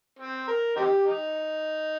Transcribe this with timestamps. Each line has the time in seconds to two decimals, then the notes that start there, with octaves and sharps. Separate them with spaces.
0.19 C4
0.48 A#4
0.76 C4 D#4 G4
1.05 D#4